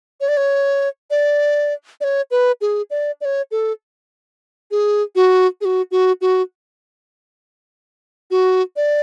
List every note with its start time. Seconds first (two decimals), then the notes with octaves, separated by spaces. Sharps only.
0.21 C#5
0.28 D5
0.37 C#5
1.11 D5
2.01 D5
2.04 C#5
2.31 B4
2.61 G#4
2.90 D5
3.21 D5
3.25 C#5
3.51 A4
4.71 G#4
5.15 F#4
5.61 G#4
5.65 F#4
5.91 F#4
6.21 F#4
8.31 F#4
8.76 D5